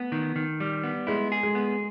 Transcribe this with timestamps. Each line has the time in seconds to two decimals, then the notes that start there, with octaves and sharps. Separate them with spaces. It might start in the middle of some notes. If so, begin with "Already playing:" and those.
Already playing: A3 B3
0.12 D#3
0.36 D#3
0.60 G3
0.83 B3
1.07 G#3 E4
1.32 G#4
1.43 G#3
1.55 B3